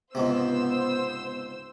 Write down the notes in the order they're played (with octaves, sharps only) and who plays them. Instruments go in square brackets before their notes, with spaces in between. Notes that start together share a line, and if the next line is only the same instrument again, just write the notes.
[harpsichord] C#2 G#2 C3 [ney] B3 [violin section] C5 E6